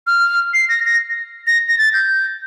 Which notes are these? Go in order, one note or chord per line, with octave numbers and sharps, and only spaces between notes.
F6
C7
A#6
A#6
A#6
A#6
A6
G6